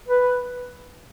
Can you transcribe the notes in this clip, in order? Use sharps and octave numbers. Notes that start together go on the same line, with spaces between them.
B4